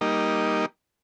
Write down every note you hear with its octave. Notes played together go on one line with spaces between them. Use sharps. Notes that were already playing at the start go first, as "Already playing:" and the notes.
G3 A#3 D#4